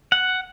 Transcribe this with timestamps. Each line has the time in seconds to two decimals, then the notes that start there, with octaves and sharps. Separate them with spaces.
0.12 F#5